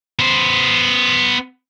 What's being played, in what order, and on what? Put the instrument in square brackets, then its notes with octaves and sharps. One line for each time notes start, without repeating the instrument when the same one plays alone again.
[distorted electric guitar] B3 C5